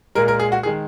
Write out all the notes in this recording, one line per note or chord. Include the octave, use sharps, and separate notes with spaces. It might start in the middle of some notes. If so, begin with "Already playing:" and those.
A#2 G#3 A#4
A#4
G#4
F#4
G#4
D#3 G#3